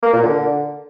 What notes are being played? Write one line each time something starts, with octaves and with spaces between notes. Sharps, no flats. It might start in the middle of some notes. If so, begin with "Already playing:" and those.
A#3
A#2
D3